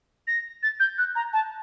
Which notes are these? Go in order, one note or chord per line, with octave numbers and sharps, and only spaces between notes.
A#6
A6
G6
F#6
A#5
A5